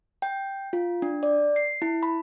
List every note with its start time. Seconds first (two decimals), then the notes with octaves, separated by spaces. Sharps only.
0.22 G5
0.73 F4
1.02 D4
1.23 D5
1.56 C7
1.82 E4
2.03 B5